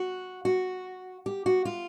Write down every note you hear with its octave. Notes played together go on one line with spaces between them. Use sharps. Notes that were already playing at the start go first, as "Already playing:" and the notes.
Already playing: F#4
F#4
G4
F#4
F4